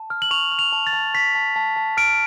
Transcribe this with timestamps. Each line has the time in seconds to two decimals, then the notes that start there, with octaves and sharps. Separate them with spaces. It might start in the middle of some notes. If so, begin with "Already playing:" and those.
Already playing: A5
0.10 F6
0.22 F#7
0.31 C#6 F7
0.52 F6
0.59 F7
0.73 A5
0.87 A6
0.93 A5
1.14 C#6 B6
1.35 A5
1.56 A5
1.76 A5
1.97 F6 D7